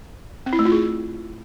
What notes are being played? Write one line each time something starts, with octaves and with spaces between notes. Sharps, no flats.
C4
E4
A3
F4
G#4